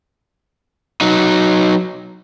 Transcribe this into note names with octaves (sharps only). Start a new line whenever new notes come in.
F#3 D#4